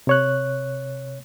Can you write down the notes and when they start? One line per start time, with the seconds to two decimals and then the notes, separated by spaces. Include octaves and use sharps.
0.07 C3 C#5 F#6